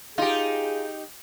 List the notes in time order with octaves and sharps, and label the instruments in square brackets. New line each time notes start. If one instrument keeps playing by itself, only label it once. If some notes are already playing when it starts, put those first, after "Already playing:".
[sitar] D#4 G4 [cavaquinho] F4 A#5 [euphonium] G#4